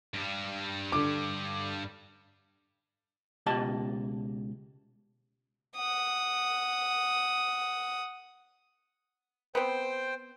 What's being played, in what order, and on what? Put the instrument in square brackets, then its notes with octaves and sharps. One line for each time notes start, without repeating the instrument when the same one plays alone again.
[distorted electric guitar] G2 G3
[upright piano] D3 D6
[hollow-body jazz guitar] C#2 B2 G4 D#5 A5
[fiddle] F#5 D#6
[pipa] B3 C4 [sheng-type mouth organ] C5 G5